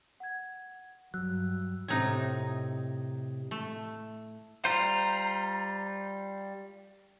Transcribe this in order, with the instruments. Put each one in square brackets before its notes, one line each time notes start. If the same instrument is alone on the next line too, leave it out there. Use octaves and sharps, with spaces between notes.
[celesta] F#5 G#6
[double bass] G2 [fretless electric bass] F#3 [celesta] E6 [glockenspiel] F#6
[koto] A2 D#4 [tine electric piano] C3 G#6
[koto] A3
[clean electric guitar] G3 F4 C5 [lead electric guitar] A#5